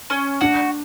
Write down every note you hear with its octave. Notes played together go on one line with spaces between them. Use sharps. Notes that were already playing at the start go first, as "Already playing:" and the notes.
C#4
D4 F#4